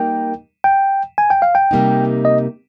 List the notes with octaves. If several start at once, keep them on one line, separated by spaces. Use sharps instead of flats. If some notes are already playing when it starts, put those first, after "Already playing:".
Already playing: G3 A#3 D#4 A#4 G5
G5
G#5
G5
F5
G5
C3 G3 A#3 D#4
D#5